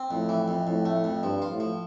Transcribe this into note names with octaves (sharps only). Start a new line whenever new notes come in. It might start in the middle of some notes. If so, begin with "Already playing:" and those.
Already playing: C4
F2 A2
E3
F2
F2 A2
A3
F2
G2 F3
F4
A2
F3